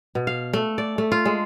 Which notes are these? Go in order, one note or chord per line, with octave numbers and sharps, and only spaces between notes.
B2
F5
A3
D5
A3
F4
G#3